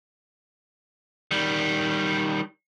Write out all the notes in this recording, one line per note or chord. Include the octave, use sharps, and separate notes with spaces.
D#3 G3